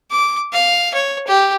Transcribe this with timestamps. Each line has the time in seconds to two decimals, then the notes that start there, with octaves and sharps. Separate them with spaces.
0.11 D6
0.53 F5
0.94 C#5
1.27 G4